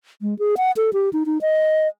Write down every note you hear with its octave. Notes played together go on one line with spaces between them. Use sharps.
G#3
G#4
F#5
A4
G4
D#4
D#4
D#5